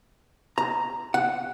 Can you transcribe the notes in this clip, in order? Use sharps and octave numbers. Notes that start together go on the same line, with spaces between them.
A#5
F#5